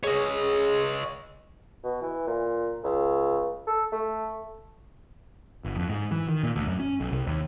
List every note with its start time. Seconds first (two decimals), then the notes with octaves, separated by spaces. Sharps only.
0.03 C#3 C#5 D#5
1.84 B2
2.02 E3
2.27 A#2
2.83 C#2
3.67 A4
3.92 A3
5.64 G1
5.77 F2
5.89 G#2
6.12 E3
6.29 D#3
6.43 A#2
6.56 D2
6.67 F#2
6.80 C#4
7.00 B1
7.12 C2
7.27 D#2